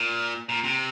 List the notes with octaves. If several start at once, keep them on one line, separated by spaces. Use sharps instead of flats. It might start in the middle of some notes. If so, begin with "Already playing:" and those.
Already playing: A#2
A#2
C3